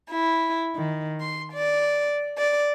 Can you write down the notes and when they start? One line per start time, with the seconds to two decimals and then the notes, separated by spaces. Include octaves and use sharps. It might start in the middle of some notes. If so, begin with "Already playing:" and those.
0.12 E4
0.75 D#3
1.21 C6
1.54 D5
2.38 D5